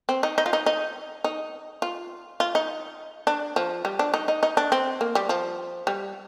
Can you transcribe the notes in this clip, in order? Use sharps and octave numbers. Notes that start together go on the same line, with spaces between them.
C4
D#4
D#4
F4
D#4
D#4
D#4
F4
F4
D#4
D4
F3
G3
D4
D#4
D#4
D#4
D4
C4
A#3
G3
F3
G3